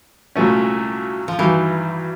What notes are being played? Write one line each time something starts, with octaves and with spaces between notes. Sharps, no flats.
C2 A#2 F#3 A3 C#4
F3
G2 D#3 E3 F#3